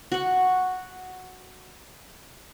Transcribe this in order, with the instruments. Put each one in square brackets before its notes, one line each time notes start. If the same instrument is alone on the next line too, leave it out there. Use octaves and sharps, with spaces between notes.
[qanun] F#4 F#5